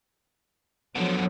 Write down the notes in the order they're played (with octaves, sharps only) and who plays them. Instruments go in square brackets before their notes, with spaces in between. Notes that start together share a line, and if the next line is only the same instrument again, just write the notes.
[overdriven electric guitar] B2 D3 [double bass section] F3 F#3